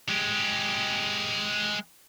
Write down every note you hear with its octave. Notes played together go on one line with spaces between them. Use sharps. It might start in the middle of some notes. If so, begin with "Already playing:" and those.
G#3 G4